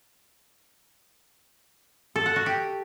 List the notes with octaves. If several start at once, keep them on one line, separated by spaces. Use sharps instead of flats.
A4
F#5
F#4
G4